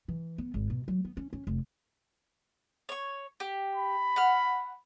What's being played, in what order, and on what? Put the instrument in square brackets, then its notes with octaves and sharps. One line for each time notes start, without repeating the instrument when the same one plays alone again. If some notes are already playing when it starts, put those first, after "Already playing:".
[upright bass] E3
B3
G#1
B2
F#3
B3
C#4
C#4
F1
[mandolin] C#5 C#6
G4
[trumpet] B5
[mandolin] F#5 F6